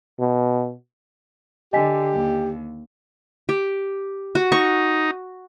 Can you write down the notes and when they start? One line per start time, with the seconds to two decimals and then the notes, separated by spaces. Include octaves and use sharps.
0.19 B2
1.73 D3 G4 D#5 G#5 B6
2.12 D#2
3.49 G4
4.35 F#4
4.52 D#4 C#6